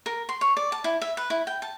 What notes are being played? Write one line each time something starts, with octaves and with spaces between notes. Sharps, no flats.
A#4
C6
C#5
D5
A5
E4
E5
B4
E4
G5
A5